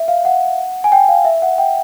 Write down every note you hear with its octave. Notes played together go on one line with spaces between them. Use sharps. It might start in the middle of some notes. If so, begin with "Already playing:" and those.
Already playing: E5
F5
F#5
G#5
G5
F5
E5
F#5
G5